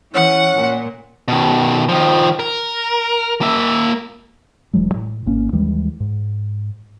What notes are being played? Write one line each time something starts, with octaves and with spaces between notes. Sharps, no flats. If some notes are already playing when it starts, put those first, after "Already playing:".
E3 C#4 F#5
A#2
B2 D#3
D#3 F3
A#4
A#3 E5
E1 E3 F#3 G#3
A2
G#1 A#3 C#4
D#2 E3 G3 G#3
G#2